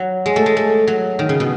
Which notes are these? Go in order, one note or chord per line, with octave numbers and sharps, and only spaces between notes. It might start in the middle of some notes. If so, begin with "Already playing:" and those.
Already playing: F#3
G#3
A3
G#3
A3
F#3
D#3
C#3
B2